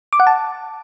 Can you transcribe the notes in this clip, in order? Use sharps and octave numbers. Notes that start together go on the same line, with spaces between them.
D6
F#5
A5